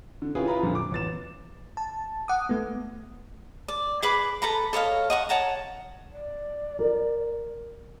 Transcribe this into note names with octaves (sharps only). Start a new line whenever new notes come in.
D3
C#4 E4 F4 G4 G#4 B4
E4 F4 B4 A#5 B5
F2 A#2 D3 F3 G3
D6
A1 B3 A6 E7
A5
F#5 D6 D#6
A3 B3
D5
G#4 B4 B5 D6
A4 B4 A#5 B5
A4 C#5 D#5 F5
D#5 F#5 C#6
C#5 F#5 A5 A#5
D5
A#4